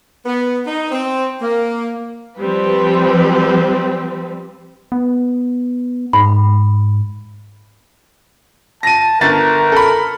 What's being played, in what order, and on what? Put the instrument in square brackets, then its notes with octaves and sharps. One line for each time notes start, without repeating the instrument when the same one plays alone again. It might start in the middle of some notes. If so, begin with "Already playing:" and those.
[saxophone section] B3
D#4
C4
A#3
[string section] F3 G3 C4 B4
[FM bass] B3
[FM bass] G#2 [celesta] B5
[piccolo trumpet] A5 [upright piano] A#6 D#7
[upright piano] G1 A6 [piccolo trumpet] A#4
[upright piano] A4 B5